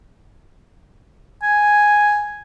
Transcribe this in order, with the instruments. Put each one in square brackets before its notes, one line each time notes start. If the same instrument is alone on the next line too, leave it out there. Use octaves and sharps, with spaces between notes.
[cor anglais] G#5